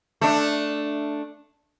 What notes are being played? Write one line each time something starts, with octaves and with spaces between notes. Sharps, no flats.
A3 D4